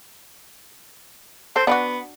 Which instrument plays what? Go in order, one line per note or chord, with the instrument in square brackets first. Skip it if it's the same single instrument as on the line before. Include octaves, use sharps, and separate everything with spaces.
[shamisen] A4 [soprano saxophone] C5
[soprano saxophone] B3 [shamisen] D4 E4 F#4